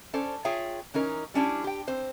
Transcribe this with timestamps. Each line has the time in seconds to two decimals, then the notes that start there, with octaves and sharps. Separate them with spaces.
0.13 C#4 A4 C5 D5
0.45 F4 G#4 C#5 E5 G5
0.94 E3 C#4 D#4 A#4
1.34 G3 C#4 D4 E4 G4
1.64 G4 G5
1.87 C4 C5